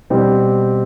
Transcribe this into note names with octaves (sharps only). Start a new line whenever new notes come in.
B2 G3 C4 G4